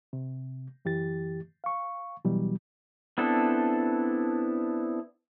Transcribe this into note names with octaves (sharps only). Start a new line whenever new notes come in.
C3
F#2 E3 G4 A6
F5 C#6
B2 E3 F#3 G3
B3 C4 D4 E4 A4